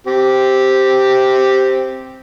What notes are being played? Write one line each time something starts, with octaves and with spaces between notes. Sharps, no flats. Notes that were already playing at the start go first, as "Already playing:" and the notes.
C4 G4